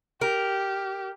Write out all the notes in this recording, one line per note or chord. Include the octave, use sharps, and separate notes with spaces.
G4 A#4